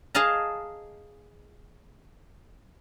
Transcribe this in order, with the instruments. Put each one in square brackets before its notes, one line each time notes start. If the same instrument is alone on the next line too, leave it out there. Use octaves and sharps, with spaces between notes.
[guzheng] G#4 D#5 F5 A5 A#5